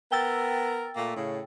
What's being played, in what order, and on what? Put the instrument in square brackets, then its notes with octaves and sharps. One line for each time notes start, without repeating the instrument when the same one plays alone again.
[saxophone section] B3 A#4 [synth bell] G5 E6 A6
[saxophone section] A#2 A3 A#3
A2 C#3